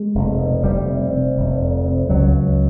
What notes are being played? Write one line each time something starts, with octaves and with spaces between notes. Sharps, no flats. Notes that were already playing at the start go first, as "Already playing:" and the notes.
Already playing: G#3
F1
B2
F1 G3
C3
C3
F1
F2
C3
C#2 F#3
C#2